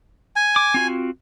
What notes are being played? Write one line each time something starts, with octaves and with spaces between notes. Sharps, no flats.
G#5
D6
C4 F4 F#4